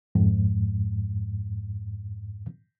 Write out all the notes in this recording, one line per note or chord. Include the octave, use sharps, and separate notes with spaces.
F2 G#2